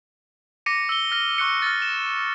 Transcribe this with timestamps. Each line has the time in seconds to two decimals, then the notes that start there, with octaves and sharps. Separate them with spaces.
0.66 D6 A#6 C#7 D#7
0.89 E6 G7
1.12 F6 A#6 G7
1.38 C#6 F#6 C#7
1.62 F6 A6
1.82 E7